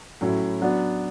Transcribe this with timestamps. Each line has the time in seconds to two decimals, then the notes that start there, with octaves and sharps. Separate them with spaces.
0.21 A2 F#3 C#4 E4
0.61 F#3 B3 D4